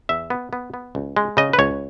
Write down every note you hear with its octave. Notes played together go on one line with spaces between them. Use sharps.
E2 E5
B3
B3
B3
C#2
G#3
C#3 D#5
B4
C#2 C#5